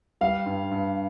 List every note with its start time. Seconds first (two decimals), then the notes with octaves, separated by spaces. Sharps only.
0.21 G3 F5
0.46 G2
0.71 G2